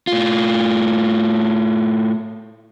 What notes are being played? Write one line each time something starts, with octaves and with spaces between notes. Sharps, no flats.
A2 F4